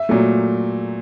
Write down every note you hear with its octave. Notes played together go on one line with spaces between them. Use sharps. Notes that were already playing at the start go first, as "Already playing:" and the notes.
Already playing: E5
A#2 F#3 A3